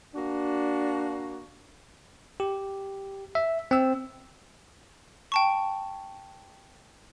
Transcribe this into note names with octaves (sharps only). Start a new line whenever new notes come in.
A#3 D4 F#4
G4
E5
C4 E6
G5 A5 C#6